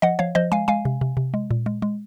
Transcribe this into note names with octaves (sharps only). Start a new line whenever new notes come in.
F3 D#5 F#5
F3 C#5 F5
F3 C5 D#5
G#3 F5 G#5
G#3 F5 G#5
C3
C3
C3
G#3
A#2
G#3
G#3